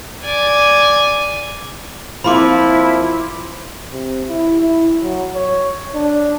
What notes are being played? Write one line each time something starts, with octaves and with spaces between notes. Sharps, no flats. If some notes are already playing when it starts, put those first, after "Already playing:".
D5 G#5
F3 A#3 C4 E4 B5 C6 D6
C3
E4
E4
F#3
C#5
D4